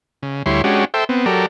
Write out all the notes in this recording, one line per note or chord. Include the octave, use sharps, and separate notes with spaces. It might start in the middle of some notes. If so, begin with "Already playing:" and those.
C#3
D2 G3 E4 C#5 C6
G#3 C#4 D4 F#4 G4
A4 C5 E5 G5
B3 C4
F#3 G4 A4 A#4 D5